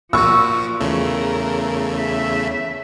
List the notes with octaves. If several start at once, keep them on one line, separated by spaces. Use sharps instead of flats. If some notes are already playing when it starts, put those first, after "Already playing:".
A#2 F3 F#4 C#6 E6
E2 C#3 A3 A#4
E5